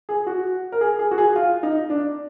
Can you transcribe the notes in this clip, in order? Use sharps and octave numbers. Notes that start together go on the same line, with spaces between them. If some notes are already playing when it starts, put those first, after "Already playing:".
G#4
F#4
A#4
G#4
G#4
F#4
G#4
F4
D#4
D4